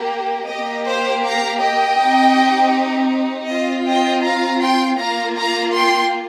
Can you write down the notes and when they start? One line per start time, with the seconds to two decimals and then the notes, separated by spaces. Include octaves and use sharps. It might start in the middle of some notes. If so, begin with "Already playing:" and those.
Already playing: A#3 G4
0.49 G4 D#5
0.54 A#3
0.87 C5 F5
1.24 F5 A#5
1.62 D#5 G5
1.99 C4 D#4 G4
3.49 C4 F4 D#5
3.86 D#5 G5
4.24 F5 A#5
4.62 G5 C6
4.99 A#3 F4 F5 A#5
5.36 F5 A#5
5.74 G5 C6